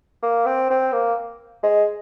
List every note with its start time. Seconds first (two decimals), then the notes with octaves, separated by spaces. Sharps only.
0.22 A#3
0.46 C4
0.70 C4
0.92 A#3
1.63 G#3